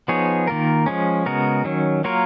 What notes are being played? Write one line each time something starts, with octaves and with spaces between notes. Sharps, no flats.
F3 B3 D#4 G#4 C#5
D#3 A#3 F4 A#4
F3 G#3 C#4
C#3 G#3 B3 F#4 A#4
D#3 F#3 C#4
F#3 A#3 F4 A#4 C#5